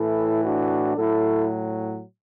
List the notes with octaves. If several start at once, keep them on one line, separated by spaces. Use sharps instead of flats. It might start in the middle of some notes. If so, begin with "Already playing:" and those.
Already playing: A2 E3 E4 A4
D4 F#4
A2 F#3 E4 A4